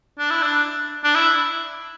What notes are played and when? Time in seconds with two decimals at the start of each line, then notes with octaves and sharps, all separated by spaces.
0.19 D4
0.31 E4
0.42 D4
1.04 D4
1.15 E4